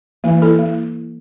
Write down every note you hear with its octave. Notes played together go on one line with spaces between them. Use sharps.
E3 A#3
E4 A4
A#3